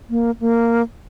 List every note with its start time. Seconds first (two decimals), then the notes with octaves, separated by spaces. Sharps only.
0.10 A#3
0.40 A#3